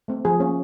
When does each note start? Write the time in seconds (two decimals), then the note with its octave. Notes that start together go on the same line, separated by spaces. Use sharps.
0.08 A3 C4
0.25 F3 G#4
0.40 A#3 C#4